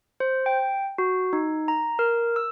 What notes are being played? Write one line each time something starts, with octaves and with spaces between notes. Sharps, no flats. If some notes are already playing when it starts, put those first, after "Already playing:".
C5
G5
F#4
D#4
A#5
A#4
E6